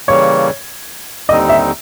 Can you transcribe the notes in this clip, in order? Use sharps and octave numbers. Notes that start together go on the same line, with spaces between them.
C#3 E3 G3 A#3 C#5
D#2 D3 G3 C4 D#4 D#5
E5